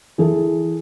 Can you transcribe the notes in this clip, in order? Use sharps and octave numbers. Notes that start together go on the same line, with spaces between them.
E3 G#4 A4